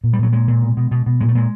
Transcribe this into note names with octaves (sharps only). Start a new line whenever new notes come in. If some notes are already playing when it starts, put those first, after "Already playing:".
A#2
G3
A#2 F#3
A#2 G#3
A#2
B2
B2
B2
B2
A#2 G#3
A3
A#2 G#3